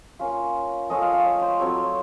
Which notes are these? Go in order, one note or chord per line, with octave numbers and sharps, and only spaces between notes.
A#3 C#4 F4 F5
F3 A3 C#4 F4 D#5
F5
F5
C#5
C5
F#3 A3 C4 F4 C#5